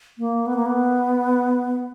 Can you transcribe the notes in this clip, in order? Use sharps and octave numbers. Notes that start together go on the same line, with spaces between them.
A#3
B3
A#3
B3